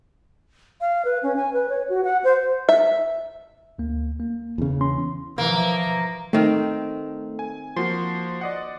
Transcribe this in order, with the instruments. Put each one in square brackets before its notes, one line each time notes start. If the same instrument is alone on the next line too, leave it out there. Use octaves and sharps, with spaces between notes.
[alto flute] F5
B4
C#4
G#5
B4
C#5
F#4
F#5
C5
[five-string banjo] E5
[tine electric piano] D2 A#3
A#3
[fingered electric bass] E2 C#3
[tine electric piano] C#4 C6
[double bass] E3 F3 [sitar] A#3
[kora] D#3 C4 [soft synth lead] A3
[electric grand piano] G#5
[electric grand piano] F3 A#3 F#4 [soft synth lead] C6
[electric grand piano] D5 D#5 F#5